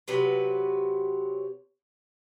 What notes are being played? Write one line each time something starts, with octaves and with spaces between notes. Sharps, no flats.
C3 F#3 B4